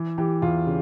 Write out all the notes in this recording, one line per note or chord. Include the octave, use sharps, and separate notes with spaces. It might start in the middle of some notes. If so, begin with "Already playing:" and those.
Already playing: E3
E3 G4
E2 F4
C#3